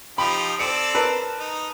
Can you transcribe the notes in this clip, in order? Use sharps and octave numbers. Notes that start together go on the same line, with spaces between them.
F3 D#4 G4 B5
C4 A4 D5 C#7
A#4 B4 A5
D#4